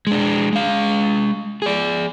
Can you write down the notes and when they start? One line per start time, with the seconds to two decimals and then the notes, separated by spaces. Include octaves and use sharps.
0.07 G#3 D4
0.53 G#3 F5
1.62 G#4 D5